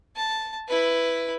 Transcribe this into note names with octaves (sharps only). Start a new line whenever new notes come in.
A5
E4 B4